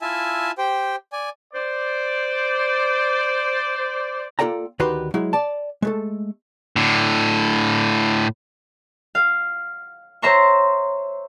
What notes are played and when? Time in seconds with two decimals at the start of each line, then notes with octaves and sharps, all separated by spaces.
0.01 E4 F4 E5 G#5 A5
0.58 G4 C5 G5
1.12 D5 G#5
1.54 C5 D5
4.39 A#3 F4 A4 D5 G5 A#5
4.79 D2 D#3 F#4 G4 B4 C6
5.14 F#3 G#3 E4
5.33 D5 A5
5.82 G#3 A3 A4
6.76 A2 D3
9.15 F5
10.22 C5 C#5 E5 A#5 C6 C#6